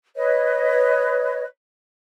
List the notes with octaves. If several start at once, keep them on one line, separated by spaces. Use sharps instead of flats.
B4 C#5 D#5